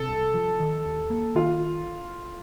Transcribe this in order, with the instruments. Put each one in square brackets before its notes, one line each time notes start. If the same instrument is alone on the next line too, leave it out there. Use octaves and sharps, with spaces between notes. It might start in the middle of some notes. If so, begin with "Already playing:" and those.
Already playing: [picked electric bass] C3 [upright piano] A4
[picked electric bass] C2
F3
D#3
D#2
A#3
[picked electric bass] D#3 [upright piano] F4